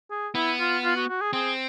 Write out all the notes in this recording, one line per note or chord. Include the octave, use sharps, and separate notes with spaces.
G#4
B3 E4
F4
F4
F#4
F#4
G#4
C4 G#4